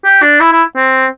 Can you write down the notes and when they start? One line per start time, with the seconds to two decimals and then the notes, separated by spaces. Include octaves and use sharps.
0.05 G4
0.22 D4
0.40 E4
0.52 E4
0.76 C4